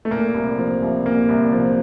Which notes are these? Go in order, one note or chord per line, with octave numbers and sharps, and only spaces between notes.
A3
A#2 A#3
C2
F3
C2
A#2 A#3
C2
F3